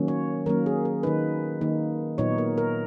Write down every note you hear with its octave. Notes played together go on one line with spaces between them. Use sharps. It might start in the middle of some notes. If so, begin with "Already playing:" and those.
Already playing: D#3 F#3 A#3 C#4
C#5
D#3 F#3 A#3 C#4 A#4
G#4
A#4
D#3 A#3 D#4 B4
D#3 A#3 D#4
A#2 F#3 B3 D#4 C#5
A#4
A#4